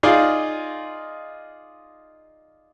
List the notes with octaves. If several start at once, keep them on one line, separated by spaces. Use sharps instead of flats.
D#4 F4 G#4 D5 D#5 F5